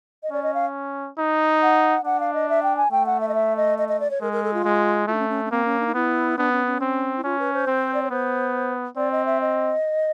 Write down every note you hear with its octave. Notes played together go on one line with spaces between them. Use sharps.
D#5
C#4 D5
D#5
F5
D#4
F#5
D4 F#5
F5
D#5
E5
G5
G#5
A3 G5
F#5
E5
D#5
E5
D#5
D#5
D#5
D5
C#5
G#3 A#4
A#4
A4
F4
G#3
A3 F4
D4
C#4
C#4
C#4
A#3 C4
C#4
D4
D#4
B3 E4
B3 D4
C#4
C#4
C4
E4
C#4 F4
B4
C5
C4
D5
C#5
B3 C5
C4 D5
D#5
E5
D#5